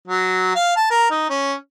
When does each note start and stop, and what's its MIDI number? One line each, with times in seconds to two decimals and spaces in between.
0.08 0.54 54
0.55 0.76 77
0.76 0.87 81
0.91 1.08 70
1.11 1.25 63
1.30 1.53 61